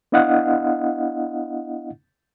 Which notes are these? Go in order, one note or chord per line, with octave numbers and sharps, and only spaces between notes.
B3 D4 E4 D#5 F5 F#5